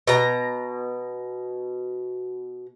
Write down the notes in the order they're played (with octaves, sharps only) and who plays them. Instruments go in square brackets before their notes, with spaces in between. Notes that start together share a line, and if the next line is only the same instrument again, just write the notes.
[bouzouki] B2 A#5